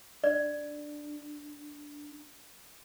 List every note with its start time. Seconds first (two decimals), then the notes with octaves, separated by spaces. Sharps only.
0.24 D4 D5